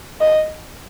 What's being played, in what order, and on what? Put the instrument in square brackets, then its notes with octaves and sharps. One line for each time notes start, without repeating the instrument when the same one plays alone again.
[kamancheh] D#5